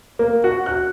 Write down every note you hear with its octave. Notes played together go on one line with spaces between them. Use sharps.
A#3
F#4
F#6